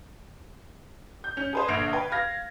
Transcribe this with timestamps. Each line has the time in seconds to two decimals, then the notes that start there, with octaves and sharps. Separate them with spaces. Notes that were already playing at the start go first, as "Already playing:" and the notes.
1.24 G6
1.37 C#4 G6 F7
1.53 G#4 B4 C5
1.68 A#1 D3 G#6 C7 D7 F7
1.93 B4 G5
2.12 F5 F6 G#6 A#6